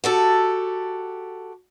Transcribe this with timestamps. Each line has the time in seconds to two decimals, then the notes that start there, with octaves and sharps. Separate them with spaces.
0.04 F#4 G4 A4